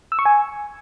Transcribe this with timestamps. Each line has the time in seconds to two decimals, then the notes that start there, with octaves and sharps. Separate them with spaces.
0.12 E6
0.19 C#6
0.25 G#5